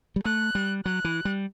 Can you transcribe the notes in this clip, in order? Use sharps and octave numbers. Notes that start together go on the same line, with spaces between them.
G3
A3 F#6
G3
F#3 F#6
E3
G3